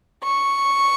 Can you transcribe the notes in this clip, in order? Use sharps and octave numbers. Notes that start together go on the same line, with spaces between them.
C#6